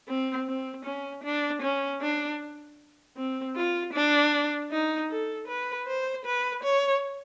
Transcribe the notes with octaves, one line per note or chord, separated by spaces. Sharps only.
C4
C4
C#4
D4
C#4
D4
C4
F4
D4
D#4
A4
B4
C5
B4
C#5